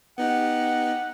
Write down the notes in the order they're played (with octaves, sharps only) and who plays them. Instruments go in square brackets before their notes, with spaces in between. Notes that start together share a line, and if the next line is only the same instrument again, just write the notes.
[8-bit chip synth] B3 D#4 G4 [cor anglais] F#5